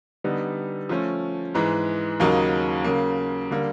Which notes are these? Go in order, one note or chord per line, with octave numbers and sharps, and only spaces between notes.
D3 G3 B3 D#4
F3 A3 C#4
G#2 E3 G#3
D#2 C#3 F#3 A#3 D#4
C#3 F#3 A#3
D3 G3 A#3